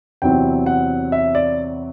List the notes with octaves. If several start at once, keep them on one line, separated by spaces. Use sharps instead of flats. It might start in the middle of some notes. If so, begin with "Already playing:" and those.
E2 C3 F#3 C4 E4 G5
F#5
E5
D5